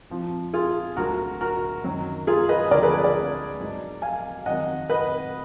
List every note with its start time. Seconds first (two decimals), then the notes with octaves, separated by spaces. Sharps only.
0.10 F2 F3
0.53 F4 G#4
0.97 D2 D3 F#3 F#4 A#4
1.41 F#4 A#4
1.84 F#2 D#3 F#3
2.27 F4 G#4
2.49 B4 D#5
2.71 D2 D3 F3 A#4 D5
2.83 G#4 B4
2.94 G#4 B4
3.04 A#4 D5
3.59 G#2 F#3
4.02 F5 G#5
4.46 F2 D#3 F#3 D#5 F#5
4.90 B4 D#5